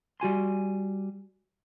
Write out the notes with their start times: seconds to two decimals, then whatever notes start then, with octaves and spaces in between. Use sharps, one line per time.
0.20 G3 F#4 G#5 C6